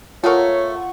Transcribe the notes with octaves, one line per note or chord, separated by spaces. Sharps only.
A3 F4 G#4 A#4 C#5 F#5 C#6